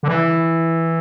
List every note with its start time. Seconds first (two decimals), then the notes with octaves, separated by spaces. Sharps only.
0.03 D3
0.08 E3